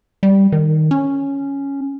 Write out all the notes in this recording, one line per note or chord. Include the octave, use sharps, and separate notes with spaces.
G3
D#3
C#4